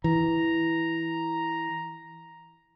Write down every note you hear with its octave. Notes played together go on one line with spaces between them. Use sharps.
E3 A#5